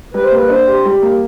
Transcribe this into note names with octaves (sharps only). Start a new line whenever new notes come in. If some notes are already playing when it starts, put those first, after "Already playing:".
G3 B4
C5
A#3 B4
D4 C5
G4
G3
A#3